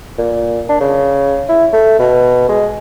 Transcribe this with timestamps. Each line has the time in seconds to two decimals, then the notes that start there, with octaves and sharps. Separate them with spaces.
0.18 A#2
0.69 D4
0.81 C#3
1.49 E4
1.73 A3
1.99 B2
2.49 G#3